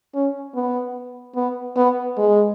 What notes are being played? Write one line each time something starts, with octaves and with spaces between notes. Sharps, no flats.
C#4
B3
B3
B3
G#3